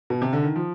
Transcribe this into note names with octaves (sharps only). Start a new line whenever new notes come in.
B2
C3
D3
D#3
F3